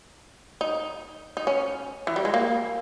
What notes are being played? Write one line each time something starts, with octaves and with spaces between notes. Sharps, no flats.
D#4
D#4
C#4
E3
G3
G#3
A#3